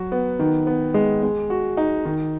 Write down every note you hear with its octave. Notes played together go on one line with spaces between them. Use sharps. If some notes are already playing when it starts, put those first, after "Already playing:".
Already playing: F#3 F#4
B3
D#3
B3
G#3
G#3
F#4
D#4
D#3